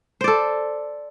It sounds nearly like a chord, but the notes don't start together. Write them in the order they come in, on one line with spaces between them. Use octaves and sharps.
C5 D5 A4